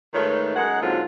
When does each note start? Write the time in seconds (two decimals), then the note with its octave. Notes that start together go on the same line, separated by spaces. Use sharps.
0.14 G#2 D#3 A3 F4 B4 C#5
0.55 F#2 G#3 D#4 F#5
0.82 G#2 D3 F#3 A#3 C4 F4